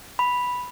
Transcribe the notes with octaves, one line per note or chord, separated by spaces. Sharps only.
B5